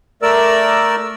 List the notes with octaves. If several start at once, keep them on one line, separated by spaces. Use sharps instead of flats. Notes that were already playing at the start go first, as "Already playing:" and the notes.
A3 A#4 D5 E6